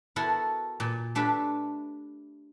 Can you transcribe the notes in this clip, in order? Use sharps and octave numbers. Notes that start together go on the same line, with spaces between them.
B3 E4 F#4 A4 A#4
A#2
A3 D4 G4 B4 E5